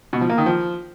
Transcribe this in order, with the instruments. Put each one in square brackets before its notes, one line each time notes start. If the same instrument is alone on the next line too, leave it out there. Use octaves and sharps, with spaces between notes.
[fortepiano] B2
F3
A#3
D#3
F3